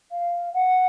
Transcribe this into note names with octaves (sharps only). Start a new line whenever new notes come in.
F5
F#5